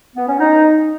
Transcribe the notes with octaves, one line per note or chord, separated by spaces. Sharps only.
B3
C#4
D#4